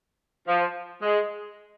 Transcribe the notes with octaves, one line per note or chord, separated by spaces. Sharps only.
F3
G#3